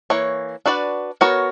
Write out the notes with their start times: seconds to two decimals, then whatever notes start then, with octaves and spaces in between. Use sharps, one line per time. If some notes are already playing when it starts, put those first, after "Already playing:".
0.10 E3 A#3 C#5
0.66 D4 F#4 B4 D5
1.21 B3 F#4 A#4 C#5